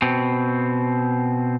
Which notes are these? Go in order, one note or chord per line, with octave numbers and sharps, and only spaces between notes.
B2 C4